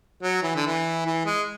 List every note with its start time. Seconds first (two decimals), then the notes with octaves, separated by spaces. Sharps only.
0.22 F#3
0.43 E3
0.55 D3
0.66 E3
1.06 E3
1.26 G#3